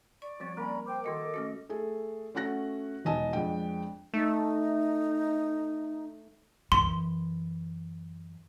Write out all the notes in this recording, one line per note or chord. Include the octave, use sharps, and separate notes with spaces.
D5 C#6
F3 G3 C4 F#4 C#5
G3 A#3 C#4 A#4 A#5 B5
C5 G5 C6 D6
D#3 F#4 A4 D#5 F#5
A3 C#4 F#4
A3 G#4 A4
A3 C#4 F#4 F#5 F#6 A#6
E1 B2 D#4 D#5 G#5 A5
F2 G#3 D4 G5
A3 D#4
F#2 E3 C6